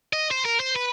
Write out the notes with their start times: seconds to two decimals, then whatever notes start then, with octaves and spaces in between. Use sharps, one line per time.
0.13 D#5
0.31 C5
0.45 A#4
0.60 C5
0.76 B4